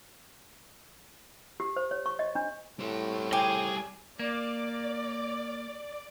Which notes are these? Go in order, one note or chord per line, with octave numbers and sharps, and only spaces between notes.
G4
C5
C#5
C#6
D#5
D4
A2 G3 C5
G4 G#4 G#5
A#3 D5